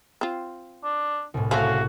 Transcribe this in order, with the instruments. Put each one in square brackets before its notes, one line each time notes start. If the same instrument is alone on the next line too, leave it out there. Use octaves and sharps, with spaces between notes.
[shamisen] C4 F4
[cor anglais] D4
[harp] C2 A2
[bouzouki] C#3 F5 G#5 [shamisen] A3 A4 C5 [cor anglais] F#4